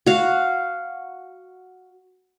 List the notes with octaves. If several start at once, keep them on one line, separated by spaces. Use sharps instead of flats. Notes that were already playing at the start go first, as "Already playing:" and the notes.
F#4 F5